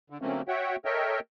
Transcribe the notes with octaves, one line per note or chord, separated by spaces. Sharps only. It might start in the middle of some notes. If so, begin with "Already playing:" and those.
D3
D3 F#3 A3 A#3 C4 C#4
F#4 C#5 E5 F#5 G5
A4 A#4 C#5 D#5 E5 G5